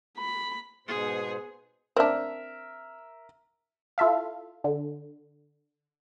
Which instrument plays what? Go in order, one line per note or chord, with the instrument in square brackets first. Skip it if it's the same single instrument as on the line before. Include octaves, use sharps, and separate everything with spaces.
[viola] B5
[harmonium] G#2 B2 C5 [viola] B3 G#4
[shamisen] C4 D4 [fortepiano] A#4 E5
[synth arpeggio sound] E4 F4 A4 E5 F5
D3